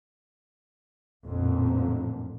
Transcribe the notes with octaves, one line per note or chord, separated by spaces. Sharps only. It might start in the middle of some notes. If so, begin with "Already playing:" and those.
A1 F2 A#2 D3